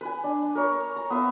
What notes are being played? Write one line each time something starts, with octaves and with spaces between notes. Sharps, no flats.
B4 G#5
D4
A#4 C#5
A#5
B3 E5 F5